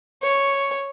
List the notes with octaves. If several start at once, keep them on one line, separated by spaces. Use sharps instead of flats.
C#5